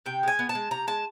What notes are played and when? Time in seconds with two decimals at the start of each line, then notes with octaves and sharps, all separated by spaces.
0.06 C3 G5
0.23 G#3 G#5
0.39 B3
0.49 A5
0.55 G#3
0.71 C3 A#5
0.87 G#3 A5